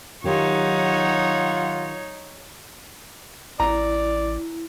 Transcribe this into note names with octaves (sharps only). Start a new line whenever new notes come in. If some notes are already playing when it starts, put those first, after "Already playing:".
D#3 F#3 D#4 F4 G4 C#5 F#5
A1 E4 D5 A#5